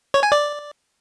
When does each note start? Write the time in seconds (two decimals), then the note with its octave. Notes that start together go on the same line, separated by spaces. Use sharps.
0.14 C#5
0.23 G#5
0.32 D5